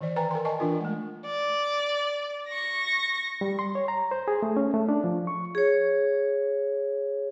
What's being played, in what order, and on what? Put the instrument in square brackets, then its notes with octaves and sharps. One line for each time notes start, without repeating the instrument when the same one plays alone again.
[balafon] D#3 E3 C5 D5
B4 G5 G#5 A#5
A#4 A#5 C6
D5 D#5 G#5 A5 C#6
E3 D4 F4 A#4
G#3 A3
[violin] D5
C#6 A#6
[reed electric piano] G3
C6
C#5
A#5
C5
G#4
A3
C#4
A3
D4
F3
C#6
[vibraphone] G#4 C#5